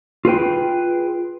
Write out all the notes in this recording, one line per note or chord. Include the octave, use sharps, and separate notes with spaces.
F4 G#4 B4 G5